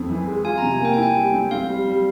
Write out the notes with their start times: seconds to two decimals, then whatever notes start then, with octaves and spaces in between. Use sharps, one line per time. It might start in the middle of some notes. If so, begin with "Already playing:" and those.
Already playing: F2 C4
0.10 E3
0.27 G#3
0.45 F4 G#5
0.58 C3 A#5
0.71 G#5
0.80 A#3 G5
0.94 E4 G#5
1.03 G5
1.15 G3
1.33 C4
1.51 C4 F5
1.69 G3
1.86 G3